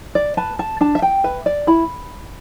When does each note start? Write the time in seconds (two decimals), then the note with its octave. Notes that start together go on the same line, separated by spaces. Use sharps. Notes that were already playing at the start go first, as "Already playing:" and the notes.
0.15 D5
0.37 B4 A5
0.59 A5
0.81 D4 A5
0.95 E5
1.02 G5
1.24 B4 E5
1.46 D5
1.67 E4 B5